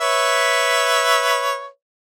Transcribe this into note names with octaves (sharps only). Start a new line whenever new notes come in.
B4 C#5 E5